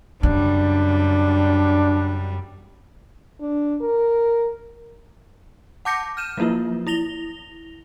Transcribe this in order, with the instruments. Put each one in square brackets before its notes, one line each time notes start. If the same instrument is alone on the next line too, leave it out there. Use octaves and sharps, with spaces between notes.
[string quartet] F#2 G3 [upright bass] C#3 [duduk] D4
[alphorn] D4
A#4
[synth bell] F#5 A5 D6 G6 A#6 C#7
F6 G6 D#7 E7
F3 F#3 A#3 E4 F4
E4 A#6 F7 G7